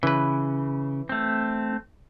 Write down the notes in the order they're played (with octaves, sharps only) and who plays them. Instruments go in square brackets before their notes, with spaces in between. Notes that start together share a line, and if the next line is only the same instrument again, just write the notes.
[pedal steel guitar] C#3 [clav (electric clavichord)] E3 B4
[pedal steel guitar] A3 C4